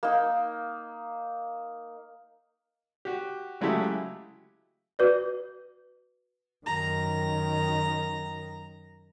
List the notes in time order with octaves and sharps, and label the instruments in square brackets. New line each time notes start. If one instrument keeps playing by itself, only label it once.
[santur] A#3 D#4
[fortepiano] F#4 G4
C#3 F#3 G#3 A3 E4 G4
[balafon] F#4 B4 D5
[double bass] F#2 D#3 [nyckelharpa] A#5